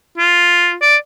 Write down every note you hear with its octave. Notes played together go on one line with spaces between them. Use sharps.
F4
D5